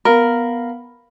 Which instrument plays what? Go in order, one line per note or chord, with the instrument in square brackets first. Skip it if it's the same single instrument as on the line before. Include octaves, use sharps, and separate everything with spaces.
[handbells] B3 F5 B5 [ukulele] A#4